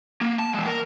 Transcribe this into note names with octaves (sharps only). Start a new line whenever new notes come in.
A#3
A5
E3 G#3
A#4